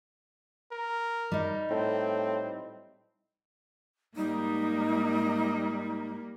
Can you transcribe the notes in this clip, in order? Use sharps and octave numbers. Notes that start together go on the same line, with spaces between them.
A#4
G3 D#4
A2 C4
G#2 G3 A#3 D#4